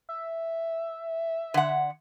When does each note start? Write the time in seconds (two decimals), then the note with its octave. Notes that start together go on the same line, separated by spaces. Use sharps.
0.09 E5
1.54 D3 F#5